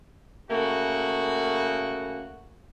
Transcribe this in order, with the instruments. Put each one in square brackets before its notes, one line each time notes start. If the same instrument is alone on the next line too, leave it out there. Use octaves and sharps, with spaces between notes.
[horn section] C#3 A3 A#3 F#4